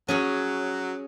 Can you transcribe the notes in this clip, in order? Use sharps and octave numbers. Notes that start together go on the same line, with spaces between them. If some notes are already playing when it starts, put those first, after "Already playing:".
F#3 C#4 G#4 C#5